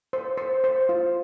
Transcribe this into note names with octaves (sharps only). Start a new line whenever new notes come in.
C5
C5
C5
F4